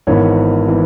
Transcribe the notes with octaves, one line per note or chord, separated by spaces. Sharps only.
G#1 G#2 E3 B3 C#5
E3 B3